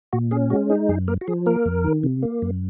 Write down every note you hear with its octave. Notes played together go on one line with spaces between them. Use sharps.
A#2 F#4
C#4 G#4
G#3 F#4
D#4 G#4
F#2 G#4
A#3 A#4
F#4
F3 G#4
A#3 A#4
F2
D#3
C3
A#3
F#2